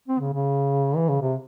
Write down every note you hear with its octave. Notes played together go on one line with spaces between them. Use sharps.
C4
C#3
C#3
E3
C#3
C3